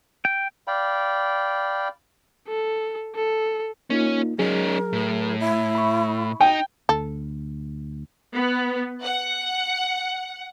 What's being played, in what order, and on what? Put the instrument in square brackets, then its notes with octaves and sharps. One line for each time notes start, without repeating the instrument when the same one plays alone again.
[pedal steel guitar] G5
[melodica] D5 F5 G5 B5
[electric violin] A4
A4
[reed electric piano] A#3 D#4 F4 [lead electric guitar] C#4
[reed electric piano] F#3 G#4 [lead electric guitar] C#4 D#4 [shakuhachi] A#4
[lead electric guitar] A2
[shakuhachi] E4
[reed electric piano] B5 C#6
[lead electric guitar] D#4 [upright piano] G5
[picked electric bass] D2 [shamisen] A4
[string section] B3
F#5